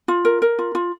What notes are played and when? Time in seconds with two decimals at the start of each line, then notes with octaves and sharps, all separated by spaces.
0.08 F4
0.25 A#4
0.42 A#4
0.59 F4
0.75 F4